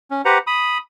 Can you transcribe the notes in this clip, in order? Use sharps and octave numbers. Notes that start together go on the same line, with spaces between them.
C#4
G4 B4 C5 F#5 A#5
B5 D#6